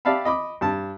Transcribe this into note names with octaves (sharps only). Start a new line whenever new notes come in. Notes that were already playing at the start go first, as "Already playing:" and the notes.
G4 D5 E5 F5 A5 B5
D#5 B5 D6
G2 A5